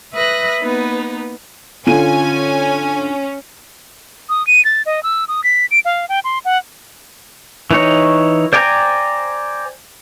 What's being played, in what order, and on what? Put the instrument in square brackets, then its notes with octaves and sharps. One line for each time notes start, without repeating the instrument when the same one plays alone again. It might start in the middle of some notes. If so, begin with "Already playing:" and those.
[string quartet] B4 E5 B5 D#6 F#6 A#6
A#3 B3 D#4 B4
[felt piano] D3 F4 D#7 [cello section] C#4 [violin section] G#5
[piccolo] D#6
D#7
A6
D#5
E6
D#6
B6
D7
F5
G5
C6
F#5
[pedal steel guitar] E3 D#4 C#5
C5 D5 G5 G#5 A#5